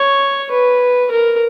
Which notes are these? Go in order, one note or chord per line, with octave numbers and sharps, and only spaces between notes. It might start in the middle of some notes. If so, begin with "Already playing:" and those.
Already playing: C#5
B4
A#4